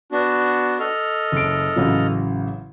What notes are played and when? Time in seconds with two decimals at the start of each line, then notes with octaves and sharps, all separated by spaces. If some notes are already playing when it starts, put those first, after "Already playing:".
0.12 B3 D4 F#4
0.80 A4 D#5 F6
1.32 F#1 D7
1.76 A1 C#3 F#3